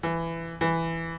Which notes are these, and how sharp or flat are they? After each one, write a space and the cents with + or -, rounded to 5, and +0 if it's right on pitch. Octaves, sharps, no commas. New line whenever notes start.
E3 +15
E3 +5